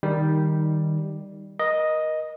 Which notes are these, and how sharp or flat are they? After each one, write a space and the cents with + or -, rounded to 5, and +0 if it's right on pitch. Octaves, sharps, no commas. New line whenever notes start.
D#3 +0 G3 +0 D#4 +15
A#4 +35 D#5 +0